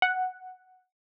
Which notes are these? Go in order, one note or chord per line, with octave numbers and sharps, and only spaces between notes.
F#5